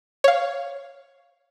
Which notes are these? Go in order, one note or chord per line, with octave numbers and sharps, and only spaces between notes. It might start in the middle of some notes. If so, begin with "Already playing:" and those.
C#5 F5